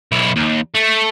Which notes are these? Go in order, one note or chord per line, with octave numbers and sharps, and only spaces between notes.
B1 E4
D#2
A3